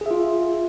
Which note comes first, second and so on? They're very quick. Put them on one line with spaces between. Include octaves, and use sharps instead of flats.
G#4 E5 F4